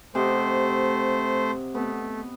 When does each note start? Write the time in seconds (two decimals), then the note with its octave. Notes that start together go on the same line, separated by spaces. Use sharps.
0.15 C3 A3 C5 D#5 F#5
1.75 A3 B3